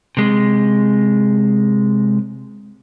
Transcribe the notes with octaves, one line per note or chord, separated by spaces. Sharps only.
C3 G#3